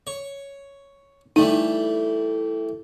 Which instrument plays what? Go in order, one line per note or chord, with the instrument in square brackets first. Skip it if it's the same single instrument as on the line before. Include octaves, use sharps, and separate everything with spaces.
[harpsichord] C#5
[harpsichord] E3 G3 A3 [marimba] D#4